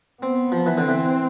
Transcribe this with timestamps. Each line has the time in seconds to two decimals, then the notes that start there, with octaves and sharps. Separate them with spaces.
0.22 B3 C4
0.52 F3
0.66 E3
0.78 D3 C4
0.88 E3